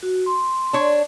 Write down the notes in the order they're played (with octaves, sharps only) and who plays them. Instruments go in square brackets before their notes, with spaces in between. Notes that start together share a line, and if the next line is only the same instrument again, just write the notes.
[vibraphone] F#4
C6
[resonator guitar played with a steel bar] D4 C#5